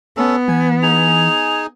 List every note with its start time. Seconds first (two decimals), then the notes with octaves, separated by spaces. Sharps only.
0.17 B3 C#4 A4
0.48 E3 G#5
0.82 D#4 G#4 G#5 F7